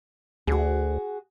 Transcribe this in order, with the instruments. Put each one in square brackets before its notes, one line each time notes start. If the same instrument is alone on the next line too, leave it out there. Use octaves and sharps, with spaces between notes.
[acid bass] D2 [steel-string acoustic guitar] F#4 G#4